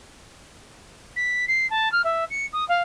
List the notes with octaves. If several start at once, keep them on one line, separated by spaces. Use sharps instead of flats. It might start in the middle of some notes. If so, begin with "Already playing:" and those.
B6
C7
A5
F6
E5
C#7
D#6
F5